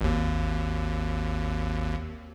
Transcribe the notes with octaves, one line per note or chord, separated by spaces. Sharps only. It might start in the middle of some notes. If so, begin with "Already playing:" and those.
G#1 D#2